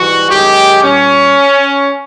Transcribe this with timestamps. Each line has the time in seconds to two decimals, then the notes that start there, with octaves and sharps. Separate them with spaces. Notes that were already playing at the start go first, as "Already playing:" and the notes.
Already playing: G#2 E3 G3 F#4
0.30 F#2 D#3 G#3 G4
0.81 A#2 G3 C#4